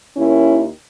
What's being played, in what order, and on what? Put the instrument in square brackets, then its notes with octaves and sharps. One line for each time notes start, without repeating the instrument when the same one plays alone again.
[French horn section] D#2 D#3 C#4 E4